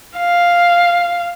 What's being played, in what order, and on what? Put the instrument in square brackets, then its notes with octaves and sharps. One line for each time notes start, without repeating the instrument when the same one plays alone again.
[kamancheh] F5